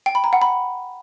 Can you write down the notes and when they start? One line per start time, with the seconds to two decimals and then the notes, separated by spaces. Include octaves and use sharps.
0.06 G5
0.15 B5
0.24 A#5
0.33 F#5
0.42 B5